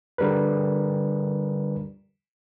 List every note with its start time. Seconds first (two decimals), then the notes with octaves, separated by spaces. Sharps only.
0.18 D3 G3 A#4 B4